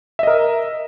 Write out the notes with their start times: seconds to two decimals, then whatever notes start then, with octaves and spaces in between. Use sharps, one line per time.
0.19 E5
0.23 D#5
0.27 A#4